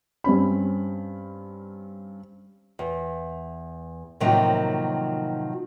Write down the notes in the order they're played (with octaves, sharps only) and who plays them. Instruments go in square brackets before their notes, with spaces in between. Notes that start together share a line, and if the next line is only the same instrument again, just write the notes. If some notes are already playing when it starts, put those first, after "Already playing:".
[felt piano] G2 C4 C#4 B5
[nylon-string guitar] E2
A2 C3 D#3 F3 F#3 A#3